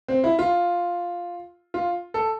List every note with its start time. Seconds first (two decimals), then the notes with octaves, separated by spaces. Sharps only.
0.08 C4
0.24 E4
0.39 F4
1.74 F4
2.14 A4